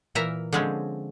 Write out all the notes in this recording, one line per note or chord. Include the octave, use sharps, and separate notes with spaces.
A#2 E3 A#4 E5 A#5
D3 F3 G#3 C4 C#4